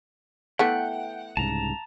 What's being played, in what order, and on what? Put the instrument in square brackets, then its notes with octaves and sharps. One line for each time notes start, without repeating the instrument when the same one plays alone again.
[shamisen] E3 A3 B3 [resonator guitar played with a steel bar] F#5 [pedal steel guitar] G5
[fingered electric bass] C2 G#2 C#3 [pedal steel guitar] A5 A#5